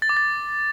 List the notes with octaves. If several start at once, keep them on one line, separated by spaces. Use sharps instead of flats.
A6
D6
A6